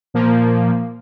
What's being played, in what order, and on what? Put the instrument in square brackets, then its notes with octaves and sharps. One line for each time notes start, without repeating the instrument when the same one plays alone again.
[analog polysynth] A#2 F3 A#3